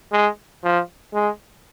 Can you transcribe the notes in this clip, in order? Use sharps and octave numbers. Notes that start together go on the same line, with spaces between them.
G#3
F3
G#3